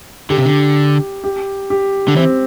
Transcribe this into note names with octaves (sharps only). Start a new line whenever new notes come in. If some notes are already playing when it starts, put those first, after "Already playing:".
D3 G4
C3
D3
G4
G4
D3
E3 C4